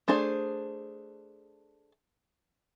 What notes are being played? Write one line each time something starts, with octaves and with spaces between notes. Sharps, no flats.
A3 D4 G#4 C5